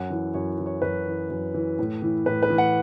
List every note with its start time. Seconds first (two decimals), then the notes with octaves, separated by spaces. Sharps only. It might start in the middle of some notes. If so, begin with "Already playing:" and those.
Already playing: F#2 F#5
0.10 E3
0.34 F#2 C#5
0.58 E3
0.66 C#5
0.82 F#2 B4
1.06 E3
1.30 F#2
1.54 E3
1.79 A2
2.02 E3
2.26 A2 B4
2.43 B4
2.50 E3
2.58 F#5